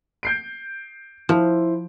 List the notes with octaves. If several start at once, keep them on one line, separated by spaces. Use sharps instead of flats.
G6 C7 D7
F3 E4 C5